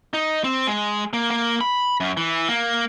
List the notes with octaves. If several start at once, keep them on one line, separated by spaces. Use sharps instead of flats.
D#4
C4
G#3
A#3
A#3
B5
F#2
E3
A#3